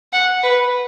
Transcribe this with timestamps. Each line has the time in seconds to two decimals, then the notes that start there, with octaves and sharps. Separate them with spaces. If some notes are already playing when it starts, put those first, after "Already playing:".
0.13 F#5
0.43 B4